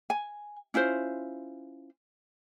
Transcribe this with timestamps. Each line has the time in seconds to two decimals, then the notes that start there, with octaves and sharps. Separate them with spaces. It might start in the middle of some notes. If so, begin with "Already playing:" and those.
0.10 G#5
0.74 C#4 E4 F4 C5